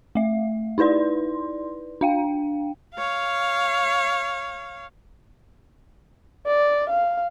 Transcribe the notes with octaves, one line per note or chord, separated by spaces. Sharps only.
A3 E5
D#4 E4 B4 D5 C6
D4 F5 G5
C#5 F5
D5
F5